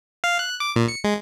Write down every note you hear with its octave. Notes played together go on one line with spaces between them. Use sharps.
F5
F#6
D6
A#2
C#7
G#3